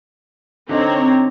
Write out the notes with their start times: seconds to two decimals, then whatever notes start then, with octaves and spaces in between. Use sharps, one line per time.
0.69 D3 C4 D#4 C#5 A#5